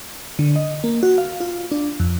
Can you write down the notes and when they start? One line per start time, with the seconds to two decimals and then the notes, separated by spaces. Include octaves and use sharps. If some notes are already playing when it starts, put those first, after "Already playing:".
0.39 D3
0.56 D#5
0.84 A#3
1.03 F#4
1.18 F5
1.40 F4
1.71 D4
2.00 F2